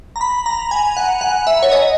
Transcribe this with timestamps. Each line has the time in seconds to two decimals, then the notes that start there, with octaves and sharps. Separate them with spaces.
0.16 A#5
0.21 B5
0.46 A#5
0.71 G#5
0.97 F#5
1.21 F#5
1.47 E5
1.63 C#5
1.72 D#5